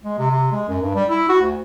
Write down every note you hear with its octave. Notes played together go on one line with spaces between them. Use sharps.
G#3
C3
C3
G#3
F#2
G2
G3
E4
F#4
D2